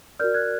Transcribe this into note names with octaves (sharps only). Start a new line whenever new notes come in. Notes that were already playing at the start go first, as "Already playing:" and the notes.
F#4 A#4 D5 F6 G6
F#6 G#6